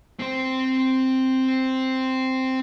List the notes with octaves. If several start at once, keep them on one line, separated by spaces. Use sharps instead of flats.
C4 C5